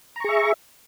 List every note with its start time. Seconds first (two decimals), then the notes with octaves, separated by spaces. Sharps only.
0.16 A#5
0.20 C#6
0.24 G#4
0.29 E5